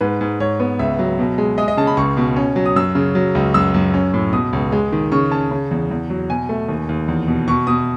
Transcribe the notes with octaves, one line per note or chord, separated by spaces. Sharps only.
G#2 B4
G#2
G#2 C#5
B3
C#2 E5
F#3
B2
G#3
G#3 D#5
D#5
C#3 A5
B5
C#2 C#6
B2
C#4
F#3
D#6
F#2 E6
C#3
F#3
C#2
F#2 E6
F#2
C#4
A2
B2 D#6
C#2
G#3
D#3
C#3 C#6
C#4 A5
C#3
E2
E2
F#3
B2 G#5
A3
D#2
D#2
E2
B2
B2 C#6
B2 D#6